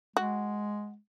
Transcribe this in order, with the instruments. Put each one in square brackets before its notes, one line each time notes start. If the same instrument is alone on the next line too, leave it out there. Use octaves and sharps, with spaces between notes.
[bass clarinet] G#3 [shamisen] F#4